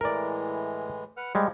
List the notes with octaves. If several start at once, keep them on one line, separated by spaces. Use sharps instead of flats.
A2 E3 G#3 A#4 D5
B4 F#5 F6
F3 G3 G#3